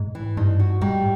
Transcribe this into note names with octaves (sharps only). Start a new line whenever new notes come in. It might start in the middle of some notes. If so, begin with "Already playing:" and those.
Already playing: G#2
E3
G2 D#4
F#4
G#2 G3